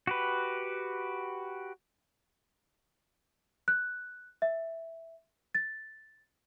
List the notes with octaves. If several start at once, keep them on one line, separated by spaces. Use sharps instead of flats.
F#4 G4 B4
F#6
E5
A6